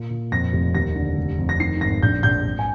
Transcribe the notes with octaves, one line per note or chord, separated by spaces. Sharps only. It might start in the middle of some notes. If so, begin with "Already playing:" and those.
Already playing: A#2
A#2
F2 A#6
F1
D#2 A#6
D3
F1
F2
A#6
D#3 C7
G#1 A#6
A#1 G6
A#1 G6
G#1
G#5